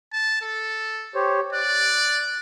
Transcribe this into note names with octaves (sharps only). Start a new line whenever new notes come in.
A5
A4
G4 C5 C#5
D5 F#6